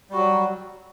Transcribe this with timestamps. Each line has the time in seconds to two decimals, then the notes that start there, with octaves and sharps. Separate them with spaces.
0.10 G3
0.13 F#4
0.16 F#3